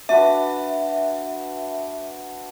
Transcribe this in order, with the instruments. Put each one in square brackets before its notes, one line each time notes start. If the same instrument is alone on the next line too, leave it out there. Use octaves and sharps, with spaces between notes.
[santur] D4 F#4 B4 [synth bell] E5